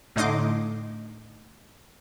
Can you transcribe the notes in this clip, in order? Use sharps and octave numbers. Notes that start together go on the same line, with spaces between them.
A2 D3 D#4 D#5 C6 D6